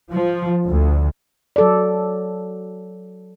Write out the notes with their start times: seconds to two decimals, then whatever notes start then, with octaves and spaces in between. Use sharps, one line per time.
0.12 F3
0.68 D2
1.56 F#3 A4 D5